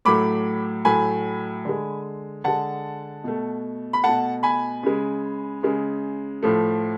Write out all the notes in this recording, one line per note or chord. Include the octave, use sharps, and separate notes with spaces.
A2 F#3 A3 B5 D6
A2 F#3 A3 G#5 B5
D3 G#3
D3 G#3 F#5 A5
B2 A3
B5
B2 A3 F#5 A5
G#5 B5
C#3 G#3
C#3 G#3
A2 F3 A3